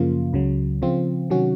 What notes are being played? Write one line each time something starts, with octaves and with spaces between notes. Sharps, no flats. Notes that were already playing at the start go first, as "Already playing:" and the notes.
Already playing: F#2 C#3 F3 A#3 F4
C#2 C#3 F#3
C#3 F3 C4 F4
C3 D#3 F#3 C#4 F#4